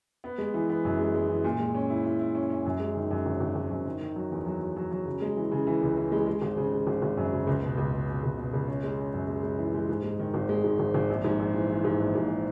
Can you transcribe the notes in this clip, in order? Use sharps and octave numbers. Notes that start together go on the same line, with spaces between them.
B3
G#3
E3
B3
F#2
G#3
G#3
E3
A#2
G#3
C#4
E4
E4
E4
C#4
C#4
F#2
G#3
D#3
F#2
G#1
G#1
G#1
F#2
D#3
D#3
F#3
E2
F#3
F#3
F#3
F#3
C#3
G#3
E3
C#3
E3
C#2
E3
G#3
G#3
G#1
C#3
G#3
G#1
G#1
F#2
C#3
C#2
B2
C#2
B2
B2
C#2
B2
C#2
C#4
G#3
C#4
F#2
G#3
G#3
E3
G#3
G#2
G#3
D#3
G#1
G#3
G#2
G#1
G#1
A#1
G#2
A#1
E3
E3
G#2
A#1
G#2